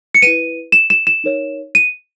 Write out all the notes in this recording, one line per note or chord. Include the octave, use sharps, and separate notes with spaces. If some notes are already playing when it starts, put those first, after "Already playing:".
C#7
E4 B4 D#7
E7
E7
E7
D#4 A#4 C#5
D#7